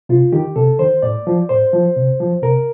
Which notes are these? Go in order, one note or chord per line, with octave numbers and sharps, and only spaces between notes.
C3 F4
D#3 G4
C3 A4
D#3 C5
A2 D5
F3
A2 C5
F3
C3
F3
C3 A#4